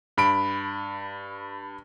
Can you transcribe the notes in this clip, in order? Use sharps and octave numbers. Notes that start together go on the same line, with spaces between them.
G2 B5 D7